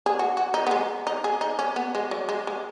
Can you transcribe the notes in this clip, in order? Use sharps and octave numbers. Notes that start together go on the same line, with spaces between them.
G#4
F#4
F#4
D#4
B3
G#3
D#4
G#4
D#4
C#4
B3
G#3
F#3
G#3
G#3